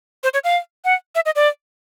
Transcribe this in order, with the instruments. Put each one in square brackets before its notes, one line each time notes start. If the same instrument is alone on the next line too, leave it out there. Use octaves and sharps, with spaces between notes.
[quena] C5
C#5
F5
F#5
E5
D#5
D5